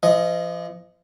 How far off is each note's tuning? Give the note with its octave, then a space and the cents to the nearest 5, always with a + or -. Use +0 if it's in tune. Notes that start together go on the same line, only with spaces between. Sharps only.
F3 -40 D#5 +0